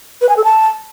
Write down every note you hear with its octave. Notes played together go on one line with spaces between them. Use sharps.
B4
G#5
A4
A5